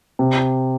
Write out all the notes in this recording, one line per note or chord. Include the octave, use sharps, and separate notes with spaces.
C3